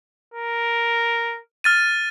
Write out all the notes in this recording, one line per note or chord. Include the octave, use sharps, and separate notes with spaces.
A#4
F6 A6 D#7